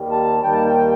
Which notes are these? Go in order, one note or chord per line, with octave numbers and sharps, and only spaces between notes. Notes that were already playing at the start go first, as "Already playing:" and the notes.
Already playing: D#2 D#3 G3
A5
D#2 D#3 G3 G5
A5
G5